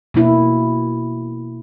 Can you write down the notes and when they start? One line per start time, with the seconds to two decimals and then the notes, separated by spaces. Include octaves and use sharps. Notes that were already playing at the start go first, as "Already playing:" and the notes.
0.14 B2 A#3 E4